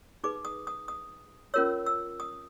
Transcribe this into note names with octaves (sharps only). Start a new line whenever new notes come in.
D#4 G#4 B4 D6
D#6
D#6
D#6
C#4 F4 A#4 C#5 E6
E6
D#6